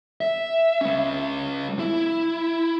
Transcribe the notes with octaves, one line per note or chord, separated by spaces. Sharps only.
E5
G#3 C#4
E4